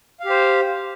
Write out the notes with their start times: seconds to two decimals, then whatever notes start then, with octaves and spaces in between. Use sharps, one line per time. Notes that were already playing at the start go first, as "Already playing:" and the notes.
0.20 F5
0.25 G4
0.30 C5